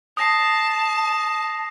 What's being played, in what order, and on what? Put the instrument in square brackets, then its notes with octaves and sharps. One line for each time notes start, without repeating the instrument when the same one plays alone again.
[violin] A5 [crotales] D#6 A#6 C7